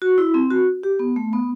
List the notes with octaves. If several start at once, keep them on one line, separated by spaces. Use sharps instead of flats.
F#4
E4
C4
F#4
G4
B3
A3
B3